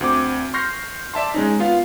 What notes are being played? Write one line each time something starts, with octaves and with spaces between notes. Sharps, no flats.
D2 C4 D6
C6 C#6 F6 G6 A#6 C7
D5 E5 A5 C6
G#3 C#4 D#4
B3 F4 F5